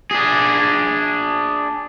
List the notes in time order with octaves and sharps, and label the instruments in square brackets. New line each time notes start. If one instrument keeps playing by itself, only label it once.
[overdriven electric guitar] D4 G#4